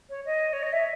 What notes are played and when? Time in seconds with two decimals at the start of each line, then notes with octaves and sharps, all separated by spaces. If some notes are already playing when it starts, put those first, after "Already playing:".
0.09 C#5
0.25 D#5
0.52 C#5
0.62 D#5
0.72 E5